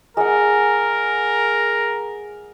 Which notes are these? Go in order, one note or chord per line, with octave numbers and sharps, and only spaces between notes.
G#3 A#4 F#5